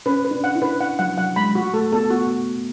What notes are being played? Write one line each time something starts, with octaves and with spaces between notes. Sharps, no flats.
C#4 B4
B4
D4
F#5
E4
B4
F#5
F#3 F#5
F#3 F#5
G#3 B5
A3 F#4
A3 A4
B3 A4
B3 F#4